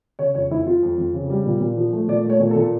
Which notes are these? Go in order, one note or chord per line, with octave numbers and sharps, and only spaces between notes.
C#3 C#5
F2 C#5
F2 E4
F2 F4
F2
F2
C#3
G3
A#2
A#2
F3
A3
A#2 D5
A3
C#5
A#2
A4
A#2